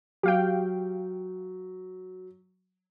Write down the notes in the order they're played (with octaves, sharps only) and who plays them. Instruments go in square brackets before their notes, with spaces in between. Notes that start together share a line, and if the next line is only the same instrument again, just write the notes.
[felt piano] F#3 [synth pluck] G4 F5 G5